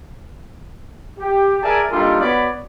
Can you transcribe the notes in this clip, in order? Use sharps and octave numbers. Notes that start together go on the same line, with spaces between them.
G4
G#4 A#4 D5 E5 G#5 A5
G3 A#3 D4 D#4 F4 A4
B3 F#4 C#5 D5 B5